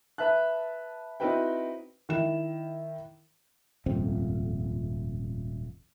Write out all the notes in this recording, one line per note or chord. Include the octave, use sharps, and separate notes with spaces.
B4 E5 A5 F#6
C4 D#4 E4 F#4 B4 G5
D#3 E4 E7
D#1 G#1 F2 C4